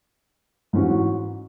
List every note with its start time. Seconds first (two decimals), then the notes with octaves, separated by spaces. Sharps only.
0.73 G#2 E3 C#4 F#4